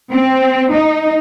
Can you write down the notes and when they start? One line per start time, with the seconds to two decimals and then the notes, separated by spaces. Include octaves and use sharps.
0.12 C4
0.74 D#4